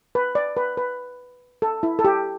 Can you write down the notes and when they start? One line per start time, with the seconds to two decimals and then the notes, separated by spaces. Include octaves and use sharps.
0.15 B4
0.35 D5
0.57 B4
0.77 B4
1.62 A4
1.83 E4
1.99 A4
2.05 G4